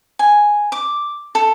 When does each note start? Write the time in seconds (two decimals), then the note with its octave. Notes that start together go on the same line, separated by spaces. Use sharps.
0.19 G#5
0.72 D6
1.35 A4